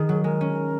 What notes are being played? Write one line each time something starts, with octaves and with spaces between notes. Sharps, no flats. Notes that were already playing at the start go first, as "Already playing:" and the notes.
Already playing: D#3 G#4
F#3
G#3 A#4
C#4